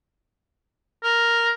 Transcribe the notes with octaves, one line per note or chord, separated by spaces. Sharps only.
A#4